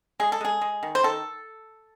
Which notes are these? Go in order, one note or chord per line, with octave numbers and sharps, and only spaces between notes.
G#3 G#4
A4
G#3 G#4
G#3
D#3
C5
D#3 A4